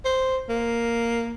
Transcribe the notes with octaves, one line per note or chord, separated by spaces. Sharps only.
C5
A#3